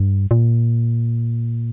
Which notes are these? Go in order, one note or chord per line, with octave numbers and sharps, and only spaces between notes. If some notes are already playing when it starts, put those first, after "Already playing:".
Already playing: G2
A#2